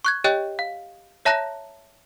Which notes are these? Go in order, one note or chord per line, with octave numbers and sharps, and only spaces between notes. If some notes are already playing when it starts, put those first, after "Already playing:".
C#6 F#6 G#6
G4 C#5 D#5 G5 F#6
F5
C#5 E5 A5 A#5 F#6 A#6